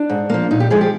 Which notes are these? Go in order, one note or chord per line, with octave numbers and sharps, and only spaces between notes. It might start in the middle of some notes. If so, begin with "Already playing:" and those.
Already playing: D4
G#2
F3 A#3
A#2 D#4
G4
F3 G#3 G#4
G4